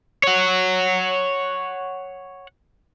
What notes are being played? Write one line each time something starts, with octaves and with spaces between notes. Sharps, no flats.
C#5 F#5